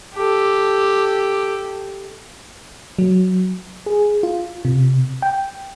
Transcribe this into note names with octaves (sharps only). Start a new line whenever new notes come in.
G4 A4
F#3
G#4
F4
C3
G5